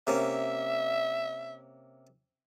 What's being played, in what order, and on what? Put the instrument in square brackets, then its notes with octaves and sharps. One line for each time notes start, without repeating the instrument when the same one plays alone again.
[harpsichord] C3 A#3 C#4 [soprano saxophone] E5